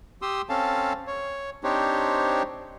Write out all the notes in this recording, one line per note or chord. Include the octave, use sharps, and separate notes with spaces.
G4 C6 D#6 E6
C4 C#4 A4 F5 A5
C#5
C4 D4 D#4 G4 C5 C#5